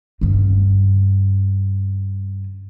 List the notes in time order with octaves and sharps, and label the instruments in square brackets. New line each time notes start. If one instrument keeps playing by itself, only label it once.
[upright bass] G2 C#3